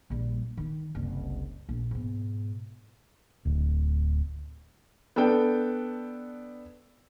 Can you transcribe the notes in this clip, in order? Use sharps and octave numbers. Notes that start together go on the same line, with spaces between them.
A#1 G3
D#3 D#4
F#1 C2
A#1
G#2 B2
D1
B3 D4 A4 G5